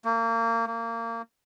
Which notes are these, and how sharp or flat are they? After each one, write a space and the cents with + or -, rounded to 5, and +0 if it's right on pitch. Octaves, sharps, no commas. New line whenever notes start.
A#3 -30
A#3 -25